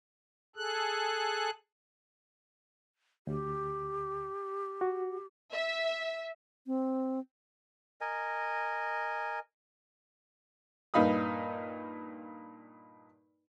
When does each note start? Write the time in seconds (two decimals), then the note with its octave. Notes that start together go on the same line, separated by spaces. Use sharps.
0.56 G#4 A4 F#6
3.27 D2 G4
4.81 F#4
5.52 E5
6.67 C4
8.01 A#4 D#5 G#5
10.94 G2 A#2 D#4 F5 B5 D#6